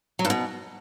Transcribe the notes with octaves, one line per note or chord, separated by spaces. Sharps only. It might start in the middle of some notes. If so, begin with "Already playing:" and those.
F#3
G2
B2